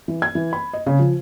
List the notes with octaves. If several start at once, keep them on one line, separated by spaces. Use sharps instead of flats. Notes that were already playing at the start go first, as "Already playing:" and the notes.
E3
G#6
E3
B5
D#5
C#3
F3